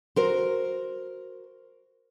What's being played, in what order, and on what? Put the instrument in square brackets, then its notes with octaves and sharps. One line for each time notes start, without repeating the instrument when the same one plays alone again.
[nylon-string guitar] F#4 A#4 C5